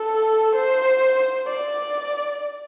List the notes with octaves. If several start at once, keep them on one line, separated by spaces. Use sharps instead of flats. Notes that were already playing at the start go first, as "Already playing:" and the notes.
Already playing: A4
C5
D5